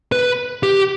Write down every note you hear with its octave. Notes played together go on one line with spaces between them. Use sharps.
B4
G4